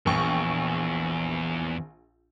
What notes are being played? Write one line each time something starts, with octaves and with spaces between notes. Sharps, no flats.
A#1 E2 G5 C#6